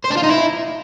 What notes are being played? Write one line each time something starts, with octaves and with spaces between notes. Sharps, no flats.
C5
D4
F4
D#4
E4